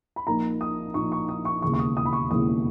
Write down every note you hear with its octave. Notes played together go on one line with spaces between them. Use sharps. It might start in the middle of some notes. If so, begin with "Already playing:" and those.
B5
A#1 A#2 A#3 D#4 A#5
D#6
A#1 A#2 A#3 D#4 C#6
C#6
D#6
C#6
E1 D#2 C#3 E3 C#6
C#6
D#6
D#6
B5
C#6
E1 D#2 C#3 E3 D#6